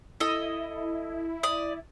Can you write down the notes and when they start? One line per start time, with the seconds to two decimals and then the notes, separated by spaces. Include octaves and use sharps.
0.20 E4 A4 D#5
1.43 D5 D#6